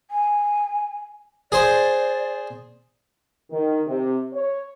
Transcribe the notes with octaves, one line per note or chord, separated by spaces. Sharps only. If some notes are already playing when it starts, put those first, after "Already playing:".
G#5
G#4 C5 D5
D#3
C3
C#5